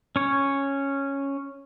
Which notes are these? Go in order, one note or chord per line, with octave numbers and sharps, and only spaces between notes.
C#4 C#5